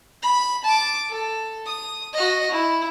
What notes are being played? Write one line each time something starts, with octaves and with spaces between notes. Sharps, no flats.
B5
A5 D6
A4
D#6
F#4 D#5
E4